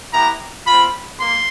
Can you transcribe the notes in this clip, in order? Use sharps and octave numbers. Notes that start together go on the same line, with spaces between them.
B3 E4 G4 A#5
C4 F4 B5
A#3 C6